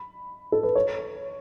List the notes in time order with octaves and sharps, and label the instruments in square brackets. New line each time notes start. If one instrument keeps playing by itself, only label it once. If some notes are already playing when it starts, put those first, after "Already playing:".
Already playing: [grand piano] B5
A4
B4
C#5